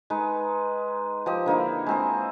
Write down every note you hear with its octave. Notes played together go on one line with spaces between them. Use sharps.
G#3 D#4 B4
F3 G4 D#5
D3 A#3 D#4 E4
G#3 C4 G#4